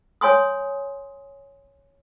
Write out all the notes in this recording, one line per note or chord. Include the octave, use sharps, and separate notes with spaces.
C#5 G#5 C6 D#6